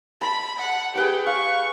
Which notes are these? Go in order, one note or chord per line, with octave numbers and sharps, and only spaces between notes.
A5 B5
F#5
G4 G#4 B4 D5
F5 C#6